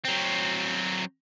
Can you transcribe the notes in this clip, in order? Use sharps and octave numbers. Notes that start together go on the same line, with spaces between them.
F#3 C4